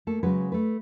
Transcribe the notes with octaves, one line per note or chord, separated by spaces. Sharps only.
A3 A#3 A4
C#3 F#3 G#3 F#4 B4
A3 B4